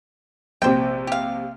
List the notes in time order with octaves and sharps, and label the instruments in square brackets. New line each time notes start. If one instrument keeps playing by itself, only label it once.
[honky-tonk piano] A#1 C3 [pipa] C5 G5
[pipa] G4 F5